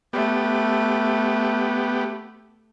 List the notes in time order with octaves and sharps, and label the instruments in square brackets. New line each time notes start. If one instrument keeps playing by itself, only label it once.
[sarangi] A3 [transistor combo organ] B3 G4